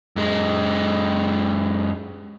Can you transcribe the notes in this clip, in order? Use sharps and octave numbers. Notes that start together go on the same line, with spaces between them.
F#2 G#3